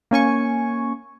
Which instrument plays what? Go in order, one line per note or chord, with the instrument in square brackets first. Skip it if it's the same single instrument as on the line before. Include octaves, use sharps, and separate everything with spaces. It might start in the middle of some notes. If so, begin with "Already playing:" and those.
[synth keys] A#3 C#4 G#5 C#6